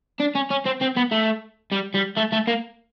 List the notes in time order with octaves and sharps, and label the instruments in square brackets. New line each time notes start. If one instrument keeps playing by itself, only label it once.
[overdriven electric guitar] D4
C#4
C#4
C4
C4
B3
A3
G3
G3
A3
A3
A#3